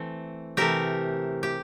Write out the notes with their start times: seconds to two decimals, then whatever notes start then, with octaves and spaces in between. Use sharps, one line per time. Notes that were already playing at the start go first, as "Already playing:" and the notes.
Already playing: E3 A3 C4
0.57 C3 E3 A3 G4 A#4
1.43 G4